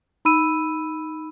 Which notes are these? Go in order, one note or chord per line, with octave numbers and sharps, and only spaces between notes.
D#4 B5 E6 D#7